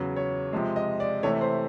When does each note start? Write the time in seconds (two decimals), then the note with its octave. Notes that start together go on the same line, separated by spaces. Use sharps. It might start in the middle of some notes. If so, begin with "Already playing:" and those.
Already playing: E2 C#3 F#3
0.16 C#5
0.53 C3 F3 G#3
0.76 D#5
1.00 D5
1.23 C3 E3 A3 C#5
1.41 C5